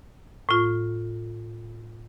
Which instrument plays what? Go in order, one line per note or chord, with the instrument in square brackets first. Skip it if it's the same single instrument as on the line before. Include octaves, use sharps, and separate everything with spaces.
[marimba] A2 F4